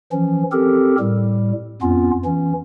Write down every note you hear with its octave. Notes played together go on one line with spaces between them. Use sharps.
E3 F3 C#4
C4 G4 A4 A#4
A2 G3
F2 B3 C#4 F4
E3 C#4